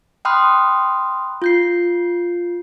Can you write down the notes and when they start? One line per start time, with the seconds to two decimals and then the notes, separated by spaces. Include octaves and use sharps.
0.25 G5 B5 C6 D#6 F6 F#6
1.42 F4 G6 C7